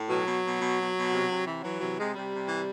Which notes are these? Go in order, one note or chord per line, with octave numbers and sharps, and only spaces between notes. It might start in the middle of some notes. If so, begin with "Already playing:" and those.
Already playing: A2
B2 F#3
B2
B2
B2
B2
B2
C3
C3
E3
E3 F#3
C3 F#3
C3 G#3
C3 G3
C3
E3